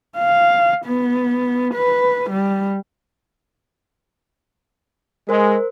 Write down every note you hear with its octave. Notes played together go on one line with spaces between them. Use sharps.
F5
B3
B4
G3
G#3 A#4 C5